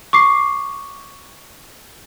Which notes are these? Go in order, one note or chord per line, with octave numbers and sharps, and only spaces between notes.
C#6 D6 C7